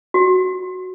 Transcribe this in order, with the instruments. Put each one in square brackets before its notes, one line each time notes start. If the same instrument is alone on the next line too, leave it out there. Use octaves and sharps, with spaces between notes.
[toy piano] F#4